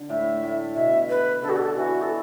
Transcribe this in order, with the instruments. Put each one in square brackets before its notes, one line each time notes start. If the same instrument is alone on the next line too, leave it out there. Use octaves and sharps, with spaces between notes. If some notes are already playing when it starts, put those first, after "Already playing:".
Already playing: [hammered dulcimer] D3
[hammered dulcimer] A2 [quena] E5
[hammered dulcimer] A2
[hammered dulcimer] B2 [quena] E5
[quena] B4
[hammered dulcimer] D3 [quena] A4
[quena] F#4
A4
[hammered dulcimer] E3 [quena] F#4
[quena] A4